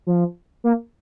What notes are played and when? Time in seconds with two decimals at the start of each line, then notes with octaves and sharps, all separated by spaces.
0.07 F3
0.64 A#3